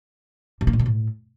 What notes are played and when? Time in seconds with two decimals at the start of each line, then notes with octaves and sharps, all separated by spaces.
0.61 C3
0.67 A#3
0.73 A#2
0.79 D3
0.86 A2